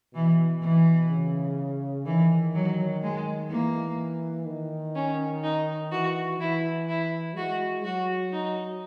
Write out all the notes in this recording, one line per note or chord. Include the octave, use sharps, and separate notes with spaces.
B2 E3
E3
C#3
D#3 E3
F#3
G#3
E3 A#3
D#3
C#4
D#4
E3 F#4
E3 E4
E4
G#3 F#4
F#3 F#4
D#4